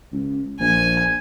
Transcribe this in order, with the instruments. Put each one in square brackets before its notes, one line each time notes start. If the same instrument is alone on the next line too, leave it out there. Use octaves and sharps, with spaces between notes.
[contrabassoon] C#2
[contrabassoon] A#1 [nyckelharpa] G#5